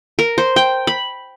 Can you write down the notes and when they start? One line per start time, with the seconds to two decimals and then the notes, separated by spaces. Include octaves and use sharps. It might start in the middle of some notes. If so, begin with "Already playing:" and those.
0.19 A#4
0.38 C5
0.56 G5
0.87 B5